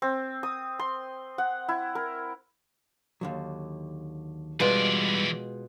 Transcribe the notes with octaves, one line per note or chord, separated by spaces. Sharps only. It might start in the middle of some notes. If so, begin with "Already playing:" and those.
C4
D#6
C6
F#5
E4
A#4
D#2 D3 F#3
B2 E3 G3 G#3 F4 D5